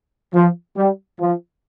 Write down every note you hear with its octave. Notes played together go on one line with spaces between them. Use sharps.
F3
G3
F3